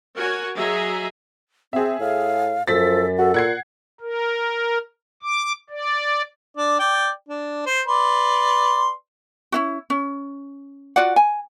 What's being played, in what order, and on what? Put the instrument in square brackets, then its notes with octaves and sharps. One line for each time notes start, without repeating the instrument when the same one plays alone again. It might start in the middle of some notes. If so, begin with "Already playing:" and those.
[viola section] F#4 A#4 C#5 F#5 G#5
F#3 G#4 D#5 E5 A#5
[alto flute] C4 [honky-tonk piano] G#4 E5
[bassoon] A2 [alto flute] F5
[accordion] F#2 [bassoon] F3 [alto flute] A4 [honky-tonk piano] A6 B6
[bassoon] F#4 [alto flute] A4
[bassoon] A#2 [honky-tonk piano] F#5 G#6 C7
[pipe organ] A#4
D6
D5
[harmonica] D4 D5
D5 G5
D4
C5
B4 D5 C6
[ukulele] C#4 E4 F#4
C#4
F4 F#4 D5 F#5
G#5